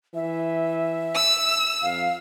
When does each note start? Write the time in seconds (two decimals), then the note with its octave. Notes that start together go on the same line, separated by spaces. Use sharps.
0.15 E3 E5
1.15 E6
1.83 F2 F5